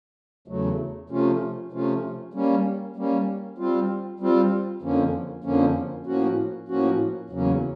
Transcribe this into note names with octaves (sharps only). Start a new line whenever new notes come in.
E2 C#3 F#3 A3
C3 F3 A3 C#4 F4
C3 F3 A3 C#4 F4
G3 A#3 C#4
G3 A#3 C#4
G3 C4 F4
G3 C4 F4
F2 D3 F3 A#3 C#4
F2 D3 F3 A#3 C#4
A2 F3 A#3 C#4 F#4
A2 F3 A#3 C#4 F#4
E2 C#3 F#3 A#3 C#4